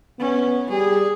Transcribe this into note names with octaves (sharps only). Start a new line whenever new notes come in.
B3 C#4
G3 G#4